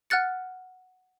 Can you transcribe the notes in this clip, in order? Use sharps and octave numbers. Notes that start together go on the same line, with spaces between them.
F#5 F6 F#6 A6 C#7